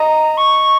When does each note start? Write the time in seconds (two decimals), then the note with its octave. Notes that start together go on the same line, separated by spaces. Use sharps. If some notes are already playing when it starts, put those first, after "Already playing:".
Already playing: D#5 A#5
0.37 C#6